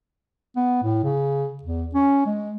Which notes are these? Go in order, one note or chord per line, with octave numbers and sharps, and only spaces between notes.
B3
A2
C#3
E2
C#4
G#3